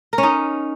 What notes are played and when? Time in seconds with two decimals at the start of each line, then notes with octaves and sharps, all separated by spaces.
0.13 A#4
0.18 C#4
0.23 D#4